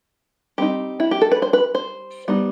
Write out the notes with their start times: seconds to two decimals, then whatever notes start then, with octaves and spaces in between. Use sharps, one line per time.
0.58 G3 C4 D#4 G4
1.00 E4
1.11 G4
1.21 A4
1.31 B4
1.42 C5
1.53 B4
1.75 C5
2.28 G3 B3 D#4